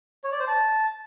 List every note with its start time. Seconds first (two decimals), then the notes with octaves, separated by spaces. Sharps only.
0.24 C#5
0.32 D5
0.40 C5
0.48 A5